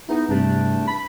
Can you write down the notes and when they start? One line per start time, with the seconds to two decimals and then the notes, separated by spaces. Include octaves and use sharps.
0.09 B3 D#4 E4 G#4
0.29 E2 G2 C3 G3 A3 D4
0.87 B5